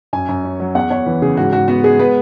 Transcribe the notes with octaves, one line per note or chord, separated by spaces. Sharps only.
F#2 G#5
F#2
C#4
F#3
E2 F#5
E2 C#5
E3 B4
C#3 G#4
G#2 F#4
G#2 F#4
B3 F#4
G#3 G#4
B3 B4